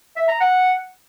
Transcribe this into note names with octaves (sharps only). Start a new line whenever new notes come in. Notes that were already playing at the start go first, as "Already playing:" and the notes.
E5
A#5
F#5